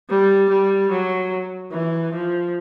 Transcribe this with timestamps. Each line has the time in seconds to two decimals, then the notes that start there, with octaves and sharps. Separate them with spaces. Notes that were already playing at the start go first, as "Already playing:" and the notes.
0.10 G3
0.49 G3
0.90 F#3
1.72 E3
2.13 F3